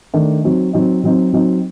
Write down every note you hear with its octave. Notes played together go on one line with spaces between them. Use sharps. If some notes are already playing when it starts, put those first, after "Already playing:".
D#3 A3 D4
F#3 C4 D#4
F#3 C4 D#4
F#3 C4 D#4
F#3 C4 D#4